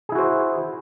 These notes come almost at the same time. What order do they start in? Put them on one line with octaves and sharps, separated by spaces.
G#4 E4 F#4 C5